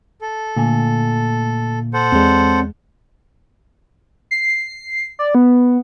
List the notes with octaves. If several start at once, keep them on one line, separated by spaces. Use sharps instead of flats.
A4
A#2 D3 A3 G#5
A4 C5 F#5
E2 G#3 C4 C#5 D5
C7
D5
B3